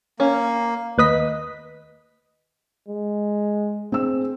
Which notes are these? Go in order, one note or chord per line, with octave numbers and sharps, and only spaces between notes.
A#3 C#4
D#2 B4 D#5 B6
G#3
C4 G#4 E6